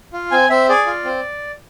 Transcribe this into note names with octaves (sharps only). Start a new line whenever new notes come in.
F4
C4 G#5
C4 E5
G#4 D5
F4
C4